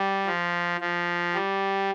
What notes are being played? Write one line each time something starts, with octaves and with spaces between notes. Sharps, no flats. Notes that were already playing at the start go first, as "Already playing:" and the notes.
Already playing: G3
F3
F3
G3